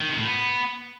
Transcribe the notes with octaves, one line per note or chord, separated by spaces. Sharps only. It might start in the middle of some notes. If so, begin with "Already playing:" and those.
D#3
C3
A2
B3